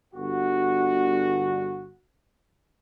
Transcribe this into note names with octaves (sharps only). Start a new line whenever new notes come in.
G1 F#4